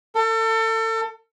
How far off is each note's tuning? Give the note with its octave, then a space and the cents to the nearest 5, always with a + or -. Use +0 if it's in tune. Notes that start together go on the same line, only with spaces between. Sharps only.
A4 +35